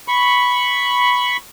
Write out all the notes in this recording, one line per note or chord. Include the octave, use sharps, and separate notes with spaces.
B5 C#6